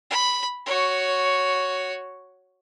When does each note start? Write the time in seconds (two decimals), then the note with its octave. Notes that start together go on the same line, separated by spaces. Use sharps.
0.10 B5
0.66 F#4 C#5